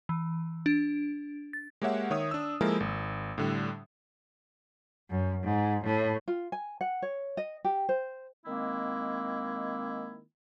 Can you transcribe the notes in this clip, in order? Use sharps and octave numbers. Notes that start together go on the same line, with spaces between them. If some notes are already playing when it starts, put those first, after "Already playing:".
E3
D4
A6
G#3 A#3 G4 C#5 E5 F#5
D#3 C#5 E5 D#6
D4 E6
F3 G#3 A#3 E4 A4 A#4
G#1
A2 D3 G3
F#2
G#2
A2
F4
G#5
F#5
C#5
D#5
G4
C5
D#3 G#3 A#3 C4 E4